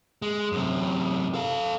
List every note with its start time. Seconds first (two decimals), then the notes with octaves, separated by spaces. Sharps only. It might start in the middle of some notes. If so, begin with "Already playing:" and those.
0.22 G#3
0.52 F#2 C3
1.34 A4 F5